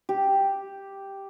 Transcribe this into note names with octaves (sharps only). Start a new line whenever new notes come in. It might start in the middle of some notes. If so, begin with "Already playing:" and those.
G4